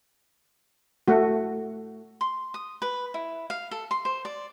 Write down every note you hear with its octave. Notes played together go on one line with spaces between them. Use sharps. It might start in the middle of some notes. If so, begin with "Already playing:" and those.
A3 F#4
C6
D#6
B4
E4
F5
A4
C6
C5
D5